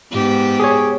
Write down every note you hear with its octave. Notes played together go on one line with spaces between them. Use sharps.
G#2 B3 G4
G#4 C#5